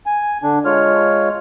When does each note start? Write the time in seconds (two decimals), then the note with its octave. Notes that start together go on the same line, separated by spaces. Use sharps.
0.06 G#5
0.43 D3 D4
0.65 G#3 F4 C#5 F6